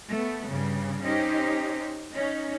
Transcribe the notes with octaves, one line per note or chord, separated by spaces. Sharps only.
A3 B3
G2 C#3
C#4 D#4 G4 C5 D#5
C#4 D#4